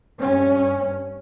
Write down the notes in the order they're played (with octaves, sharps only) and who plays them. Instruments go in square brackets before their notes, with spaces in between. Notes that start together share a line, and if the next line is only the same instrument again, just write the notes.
[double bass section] G2 C#4